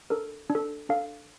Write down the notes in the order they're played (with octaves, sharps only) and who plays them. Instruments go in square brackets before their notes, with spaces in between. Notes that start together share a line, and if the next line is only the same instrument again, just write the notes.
[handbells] D4 A4 A#4
D4
A4
D4 A4 F5